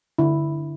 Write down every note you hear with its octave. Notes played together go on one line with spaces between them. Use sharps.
D3 E4